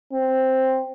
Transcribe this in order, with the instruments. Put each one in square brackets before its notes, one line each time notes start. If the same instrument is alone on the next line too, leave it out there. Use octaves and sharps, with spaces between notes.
[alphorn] C4